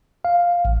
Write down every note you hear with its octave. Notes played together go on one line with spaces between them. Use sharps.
F5
A1